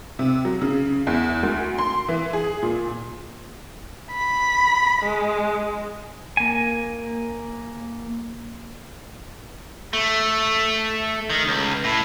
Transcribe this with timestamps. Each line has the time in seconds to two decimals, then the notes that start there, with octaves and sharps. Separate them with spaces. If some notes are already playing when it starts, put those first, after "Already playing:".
0.19 C3
0.45 F#3
0.61 C#3
1.07 E2
1.43 D2
1.78 C6
2.08 E3
2.33 G#4
2.62 A#2
4.11 B5
5.02 G#3
6.37 A#3 G#5
9.93 A3
11.30 D#3
11.48 C#2
11.84 A2